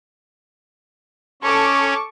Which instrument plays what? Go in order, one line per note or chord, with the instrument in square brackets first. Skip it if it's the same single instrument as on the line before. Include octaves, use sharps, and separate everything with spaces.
[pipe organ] C#4 [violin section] A4 C#6 D6